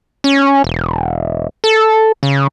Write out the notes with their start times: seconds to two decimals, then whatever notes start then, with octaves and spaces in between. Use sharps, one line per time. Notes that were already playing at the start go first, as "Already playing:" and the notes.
0.24 C#4
0.64 E1
1.64 A4
2.23 C#3